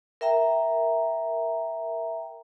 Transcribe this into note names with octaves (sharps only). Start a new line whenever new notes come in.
A#4 E5 G5 A#5